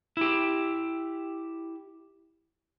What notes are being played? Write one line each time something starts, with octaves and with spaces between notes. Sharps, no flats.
E4 G4